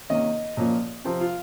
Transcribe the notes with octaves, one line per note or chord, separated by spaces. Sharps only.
C3 D#3 A#3 C#4 D#5
A#2 F3 A#3 C#4
C3 F3 C4
F4